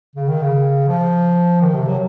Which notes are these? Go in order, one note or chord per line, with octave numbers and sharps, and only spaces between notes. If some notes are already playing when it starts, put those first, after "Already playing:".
C#3
D#3
C#3
F3
D#3
C3
F#3